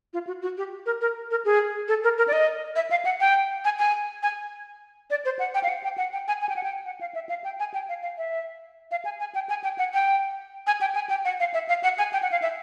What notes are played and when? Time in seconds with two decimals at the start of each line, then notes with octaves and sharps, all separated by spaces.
0.13 F4
0.27 F#4
0.42 F#4
0.58 G4
0.86 A#4
1.01 A#4
1.31 A#4
1.45 G#4
1.88 A4
2.04 A#4
2.18 A#4
2.28 D5
2.33 D#5
2.76 E5
2.91 F5
3.05 F#5
3.20 G5
3.65 G#5
3.79 G#5
4.23 G#5
5.10 D5
5.25 C5
5.39 F#5
5.54 G5
5.63 F5
5.69 F#5
5.84 G5
5.98 F#5
6.13 G5
6.28 G#5
6.42 G#5
6.49 G5
6.56 F#5
6.64 G5
6.86 F#5
7.01 F5
7.15 E5
7.29 F5
7.44 G5
7.60 G#5
7.74 G5
7.89 F5
8.02 F5
8.18 E5
8.91 F5
9.05 G#5
9.20 G#5
9.35 G5
9.49 G#5
9.64 G5
9.78 F#5
9.94 G5
10.67 G#5
10.81 G5
10.95 G#5
11.10 G5
11.25 F#5
11.40 F5
11.54 E5
11.69 F5
11.84 F#5
11.98 G#5
12.13 G5
12.23 F#5
12.32 F5
12.42 E5